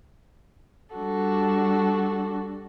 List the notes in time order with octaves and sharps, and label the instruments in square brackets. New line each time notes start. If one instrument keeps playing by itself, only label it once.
[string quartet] G3 D4 F#4 A4